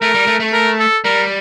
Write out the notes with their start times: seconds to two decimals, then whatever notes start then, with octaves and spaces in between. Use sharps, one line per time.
0.01 A3 A#4
0.15 G3
0.27 A3
0.40 A3
0.53 A#4
0.80 A4
1.04 G3 A#4